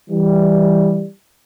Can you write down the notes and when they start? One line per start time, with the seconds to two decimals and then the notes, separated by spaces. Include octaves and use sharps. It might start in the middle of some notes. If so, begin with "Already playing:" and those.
0.10 E3 G3